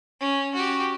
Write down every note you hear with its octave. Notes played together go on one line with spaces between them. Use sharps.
C#4
F#4 G4